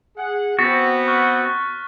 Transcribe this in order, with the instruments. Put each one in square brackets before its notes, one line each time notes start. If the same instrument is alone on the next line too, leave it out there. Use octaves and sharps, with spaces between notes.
[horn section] G#4 F#5
[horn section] B3 [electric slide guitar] C4 F#4 [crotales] A6 B6
[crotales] C#6 F6 F#6